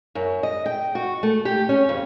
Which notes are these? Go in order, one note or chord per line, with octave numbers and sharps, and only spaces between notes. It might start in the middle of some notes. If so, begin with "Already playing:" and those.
F#2
D#5
G5
F#4
A3
G4
C#4
F2